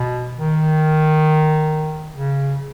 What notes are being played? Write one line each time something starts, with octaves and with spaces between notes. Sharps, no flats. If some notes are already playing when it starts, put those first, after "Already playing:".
Already playing: B2
D#3
C#3